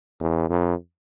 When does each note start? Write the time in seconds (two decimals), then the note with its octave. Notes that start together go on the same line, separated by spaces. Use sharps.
0.20 E2
0.49 F2